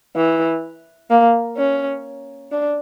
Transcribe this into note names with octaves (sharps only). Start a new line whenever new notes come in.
E3
A#3
C#4
D4